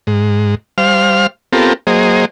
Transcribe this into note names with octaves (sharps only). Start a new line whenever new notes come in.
G#2
G3 C5 F5 F6
B3 C4 F4 G4 A4 A#4
F#3 A#3 G#4 C5 D#5